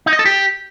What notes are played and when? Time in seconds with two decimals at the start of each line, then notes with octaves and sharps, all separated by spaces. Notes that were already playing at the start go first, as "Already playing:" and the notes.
0.06 D#4
0.13 D#5
0.19 A4
0.25 G4